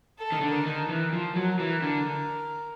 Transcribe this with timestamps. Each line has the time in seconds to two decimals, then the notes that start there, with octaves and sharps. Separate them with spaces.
0.18 A4
0.32 D#3
0.41 D3
0.50 A#4
0.66 D#3
0.80 A#4
0.89 E3
1.13 F3
1.36 F#3
1.59 E3
1.82 D3